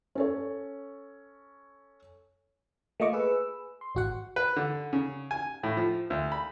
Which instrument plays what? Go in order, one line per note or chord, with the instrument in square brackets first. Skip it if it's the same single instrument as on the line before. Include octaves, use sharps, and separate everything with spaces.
[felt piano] C#4 A4 C#5
[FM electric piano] A3 A#3 F4 D#5 C#6 D6
G#4 B4 E6
C6
G#1 F#4 F#5
[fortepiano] B4
D3
C#3
G#5
A2
F3
D2
B5